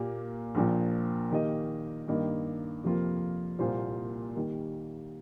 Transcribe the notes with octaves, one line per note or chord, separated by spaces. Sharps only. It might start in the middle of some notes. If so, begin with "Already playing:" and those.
Already playing: A#2 A#3 G4 A#4
A#1 A#2 F3
D#3 A#3 G4 D#5
G2 D#3 A#3 G4 D#5
F2 C3 F3 A#3 F4
C2 A#2 A#3 F4 C5
D#3 G3 A#3